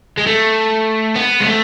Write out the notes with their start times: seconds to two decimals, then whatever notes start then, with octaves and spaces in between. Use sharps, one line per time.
0.18 G#3
0.27 A3
1.16 B3
1.41 G#3
1.47 A3